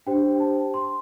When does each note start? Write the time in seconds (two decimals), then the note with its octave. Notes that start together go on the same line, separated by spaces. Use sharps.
0.06 D4 G4 C5 G5
0.40 A5
0.74 C6